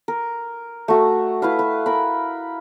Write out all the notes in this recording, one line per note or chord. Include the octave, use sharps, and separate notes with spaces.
A#4
A3 F#4
E4 B4 F5
B4
A#4 B5